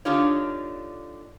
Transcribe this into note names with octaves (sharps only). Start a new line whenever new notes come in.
D3 D4 D#4 F4 G4 C#5